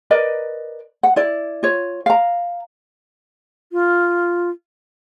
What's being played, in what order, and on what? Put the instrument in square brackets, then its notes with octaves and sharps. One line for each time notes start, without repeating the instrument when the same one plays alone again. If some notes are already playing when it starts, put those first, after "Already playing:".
[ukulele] A#4 B4 D5 D#5
F#5
E4 D5
F4 C#5
F5 A#5
[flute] F4